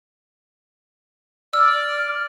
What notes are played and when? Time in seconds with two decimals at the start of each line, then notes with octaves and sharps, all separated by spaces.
1.53 D5 E6 F6